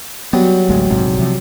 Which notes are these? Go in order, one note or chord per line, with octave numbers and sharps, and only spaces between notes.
F#3 G3 B3
A1 D2 G#3
A#1 G#2 C3
C3 F3